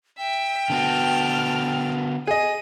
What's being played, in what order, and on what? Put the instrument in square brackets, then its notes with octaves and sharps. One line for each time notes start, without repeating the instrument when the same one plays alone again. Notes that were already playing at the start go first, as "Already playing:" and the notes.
[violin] E5 [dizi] G5
[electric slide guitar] D3 B3 F#4 [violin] A5 F6
[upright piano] G#4 D#5 [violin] D#7